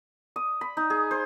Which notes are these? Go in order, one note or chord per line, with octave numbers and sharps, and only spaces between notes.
D#6
B5
D#4
G#4
C5